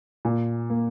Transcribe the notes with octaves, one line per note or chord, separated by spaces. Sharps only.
A#2
A#3